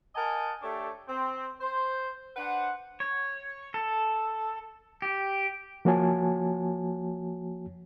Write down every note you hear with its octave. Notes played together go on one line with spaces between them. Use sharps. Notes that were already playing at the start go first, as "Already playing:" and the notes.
A#4 D#5 F#5 G#5 A5
A3 D4 G4 A4 C#5
C4
C5
D4 B4 C5 F#5
C#5
A4
G4
F3 A#3 F#4 C#5 G#5 A5